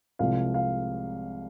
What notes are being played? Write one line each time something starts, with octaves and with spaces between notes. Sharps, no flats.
C2 C3 F3 G#3 F5
F5